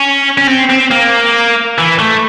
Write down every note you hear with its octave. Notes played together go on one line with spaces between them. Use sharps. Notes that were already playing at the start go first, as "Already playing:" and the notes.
Already playing: C#4
C#4
C4
C4
A#3
E3
A3